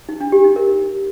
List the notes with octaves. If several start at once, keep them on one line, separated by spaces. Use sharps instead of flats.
D#4
D4
G4
D#4
A#4